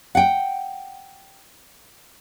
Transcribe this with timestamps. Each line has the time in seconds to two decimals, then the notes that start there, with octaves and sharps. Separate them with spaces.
0.15 F#5 G5